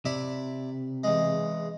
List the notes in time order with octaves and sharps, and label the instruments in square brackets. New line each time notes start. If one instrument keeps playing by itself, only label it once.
[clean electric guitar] C3 [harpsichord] E4 D5 B5
[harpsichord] E2 G#3